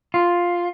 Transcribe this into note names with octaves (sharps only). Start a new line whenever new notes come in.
F4